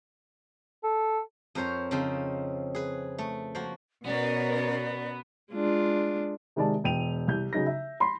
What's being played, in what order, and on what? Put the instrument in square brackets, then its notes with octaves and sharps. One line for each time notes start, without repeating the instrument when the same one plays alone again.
[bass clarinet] A4
[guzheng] F2 A#4 C5 C#5 A#5
C#3 F3 C4 D#4
G#4 B4
A3
F3 A#3 F#4
[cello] B2 [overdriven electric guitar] B3 [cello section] C#4 A#4 C#5 [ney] D5
[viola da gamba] G#3 D4 F4
[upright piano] C3 D#3 G#3 D5 A5
E1 G5 D#7 F7
C2 G6
C#3 F#3 D#4 A#6
E5
B5 C6